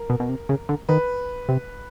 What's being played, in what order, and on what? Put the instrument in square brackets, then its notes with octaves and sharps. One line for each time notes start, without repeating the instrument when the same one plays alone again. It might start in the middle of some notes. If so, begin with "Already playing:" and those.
Already playing: [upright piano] A#4
[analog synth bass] B2
B2
C3
C#3
D3
[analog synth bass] D#3 [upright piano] B4
[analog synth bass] C3